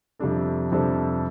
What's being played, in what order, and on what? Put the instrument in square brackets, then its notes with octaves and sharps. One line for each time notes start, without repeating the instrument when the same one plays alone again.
[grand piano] F2 C3 G3 D4 A4
F2 C3 G3 D4 A4